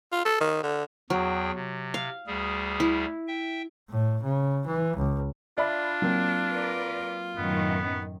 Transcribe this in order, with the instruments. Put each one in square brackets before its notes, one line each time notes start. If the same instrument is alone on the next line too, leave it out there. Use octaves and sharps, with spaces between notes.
[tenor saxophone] F4
A4
D#3
D3
[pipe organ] E2 G#4 G5 [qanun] F#3
[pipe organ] C3
[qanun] F5
[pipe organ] D2 G3 G#4
[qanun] E4
[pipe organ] E5 G5
[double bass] A2
C#3
E3
C#2
[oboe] D4 [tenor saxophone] F4 [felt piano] D5 E5 B5
[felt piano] F#3 A#3 C4
[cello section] A#4 B4 D5
[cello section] F#2 A2 D#3 [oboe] B3